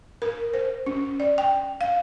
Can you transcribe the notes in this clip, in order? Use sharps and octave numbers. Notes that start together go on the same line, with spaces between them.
A#4
C5
C#4
D5
G5
F5